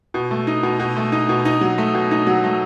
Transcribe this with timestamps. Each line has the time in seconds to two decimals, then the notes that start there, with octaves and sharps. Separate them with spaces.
0.14 B2
0.31 A3
0.47 D#4
0.63 B2
0.80 B2
0.96 A3
1.12 D#4
1.29 B2
1.45 D#4
1.61 F#3
1.78 A3
1.95 B2
2.11 D#4
2.27 F#3
2.44 A3